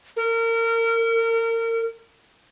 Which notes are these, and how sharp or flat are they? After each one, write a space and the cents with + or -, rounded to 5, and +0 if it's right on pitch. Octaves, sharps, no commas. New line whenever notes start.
A#4 -30